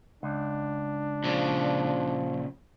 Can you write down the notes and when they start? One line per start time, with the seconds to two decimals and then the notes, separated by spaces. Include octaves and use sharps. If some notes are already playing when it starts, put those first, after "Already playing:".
0.23 C#2 D4
1.24 A#2 C#3 F3